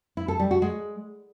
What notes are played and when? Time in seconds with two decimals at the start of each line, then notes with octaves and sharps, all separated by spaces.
0.17 E4
0.28 A4
0.40 G3
0.51 F#4
0.62 G#3